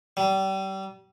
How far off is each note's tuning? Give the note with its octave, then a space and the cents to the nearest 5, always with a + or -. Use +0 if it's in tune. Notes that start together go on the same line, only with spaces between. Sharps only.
G3 -30